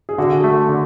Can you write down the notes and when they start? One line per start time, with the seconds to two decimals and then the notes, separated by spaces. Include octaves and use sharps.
0.09 G#4
0.18 D3 F#4
0.44 A3
0.69 D3